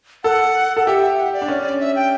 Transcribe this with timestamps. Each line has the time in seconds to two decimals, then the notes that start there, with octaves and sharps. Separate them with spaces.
0.24 A4 F#5
0.77 A4 F#5
0.86 G4 E5
1.17 F#5
1.33 D5
1.42 D4
1.48 C#4
1.80 E5
1.96 G5